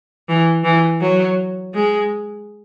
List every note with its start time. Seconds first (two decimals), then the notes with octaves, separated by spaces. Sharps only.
0.29 E3
0.64 E3
1.01 F#3
1.74 G#3